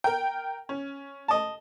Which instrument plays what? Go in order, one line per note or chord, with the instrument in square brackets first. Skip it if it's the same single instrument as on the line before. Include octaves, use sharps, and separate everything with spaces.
[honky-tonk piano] A#4 G5
C#4
[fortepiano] D#5 A5